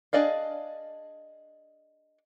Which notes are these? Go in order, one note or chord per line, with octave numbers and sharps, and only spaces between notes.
D4 G#4 D5 D#5 F5